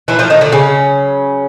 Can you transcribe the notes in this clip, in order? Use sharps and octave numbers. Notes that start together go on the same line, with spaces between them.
A#2 E3 F#3 A3 E4
F3 F4
D#3 D#4
D3 D4
C#3 C#4